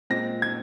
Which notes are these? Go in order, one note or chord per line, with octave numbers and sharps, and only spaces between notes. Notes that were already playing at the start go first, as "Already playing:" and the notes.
A#2 G#3 C4 A#6
G#6